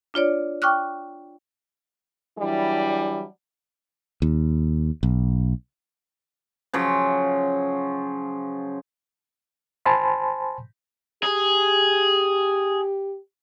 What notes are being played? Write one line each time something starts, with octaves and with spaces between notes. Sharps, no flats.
D4 F4 C#5 D5
G5 C#6 D6 F6 F#6
E3 F#3 G3 D4 E4
D#2
B1
C#3 F3 F#3
C5 G#5 A5 B5 C6
G4 G#4